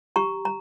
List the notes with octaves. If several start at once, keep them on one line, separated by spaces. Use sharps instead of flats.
G4 A#5 C#6
A#5